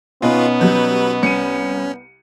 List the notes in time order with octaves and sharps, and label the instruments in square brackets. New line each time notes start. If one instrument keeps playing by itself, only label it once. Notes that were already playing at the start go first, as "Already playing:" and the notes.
[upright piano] B2 C#4 D#4 [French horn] B3 [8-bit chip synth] F4 B4
[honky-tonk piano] F#3 G3 G6 [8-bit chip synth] B4
[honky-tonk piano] C2 [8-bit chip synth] C#4 [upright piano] C#7 D#7